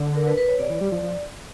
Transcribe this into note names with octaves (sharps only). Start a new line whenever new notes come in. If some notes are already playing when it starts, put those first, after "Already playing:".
Already playing: D3
A#4
B4
B4
C#5
C3 D5
E3
G3
F3
F3